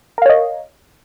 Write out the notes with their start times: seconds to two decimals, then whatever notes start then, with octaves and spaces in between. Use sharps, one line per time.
0.18 A#4
0.22 F5
0.26 C#5
0.30 D#5